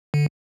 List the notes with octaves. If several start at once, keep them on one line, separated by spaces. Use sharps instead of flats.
D3